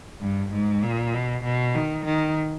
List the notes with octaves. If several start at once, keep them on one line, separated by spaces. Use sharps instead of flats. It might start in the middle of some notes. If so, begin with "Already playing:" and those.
G2
G#2
A#2
B2
B2
D#3
D#3